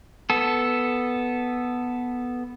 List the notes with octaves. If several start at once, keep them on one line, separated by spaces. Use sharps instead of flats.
B3 A4